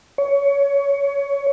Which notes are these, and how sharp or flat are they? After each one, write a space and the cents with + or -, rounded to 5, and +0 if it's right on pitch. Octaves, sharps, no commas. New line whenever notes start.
C#5 +20